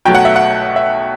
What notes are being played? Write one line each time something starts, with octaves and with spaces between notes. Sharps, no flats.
B1 B2 F#3 A3 G5
F#5
E5
F#5
E5